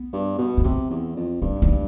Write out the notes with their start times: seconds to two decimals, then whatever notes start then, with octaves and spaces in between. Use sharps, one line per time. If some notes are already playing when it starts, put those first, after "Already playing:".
Already playing: B3
0.13 G2
0.39 B2
0.57 D4
0.64 C3 C4
0.90 E2
1.16 F2
1.41 G2 C4
1.62 D4